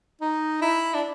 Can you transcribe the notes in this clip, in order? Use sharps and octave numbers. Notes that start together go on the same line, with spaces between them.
D#4
E4
D4